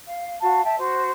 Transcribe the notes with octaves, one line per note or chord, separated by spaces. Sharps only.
F5
F#4 F5 A5
E5 G5 A5
F#4 C5